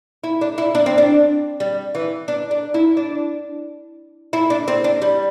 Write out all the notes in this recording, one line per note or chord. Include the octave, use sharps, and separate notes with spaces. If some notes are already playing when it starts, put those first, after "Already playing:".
E4
D4
E4
D4
C4
D4
G3
E3
D4
D4
E4
D4
E4
D4
C4
D4
G3